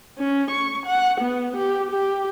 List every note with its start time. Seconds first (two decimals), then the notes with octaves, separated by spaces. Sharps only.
0.18 C#4
0.51 C#6
0.86 F#5
1.21 B3
1.56 G4
1.90 G4